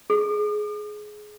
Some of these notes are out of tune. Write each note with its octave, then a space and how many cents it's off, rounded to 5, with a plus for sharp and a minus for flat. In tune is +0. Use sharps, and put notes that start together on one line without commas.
G#4 +20